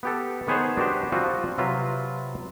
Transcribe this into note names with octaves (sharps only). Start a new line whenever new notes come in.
B3 G4 A4
D#3 B3 G#4 C5 C#5
D4 F#4 G4 C5
F3 G3 C4 F4 F#4
C3 F#3 F4 B4 E5